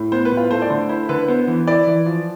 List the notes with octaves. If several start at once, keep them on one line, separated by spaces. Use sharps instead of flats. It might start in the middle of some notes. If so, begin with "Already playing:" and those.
Already playing: A2
B3 C5
B4
A2
F4
A3 C5
D5
D3 C5
E4 C5
D3 B4
B3 C5
E3
E4 D5
E3
F3